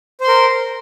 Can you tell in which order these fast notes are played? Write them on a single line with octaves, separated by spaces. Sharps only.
C5 C6 A#4